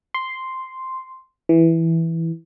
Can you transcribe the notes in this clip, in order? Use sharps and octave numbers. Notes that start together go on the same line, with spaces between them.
C6
E3